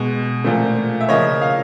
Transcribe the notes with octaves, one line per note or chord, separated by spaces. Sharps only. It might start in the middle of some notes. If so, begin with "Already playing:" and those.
Already playing: B2 G#3
A#2 F3 A3
E5
C#3 F3 A#3 C#5 D#5
F5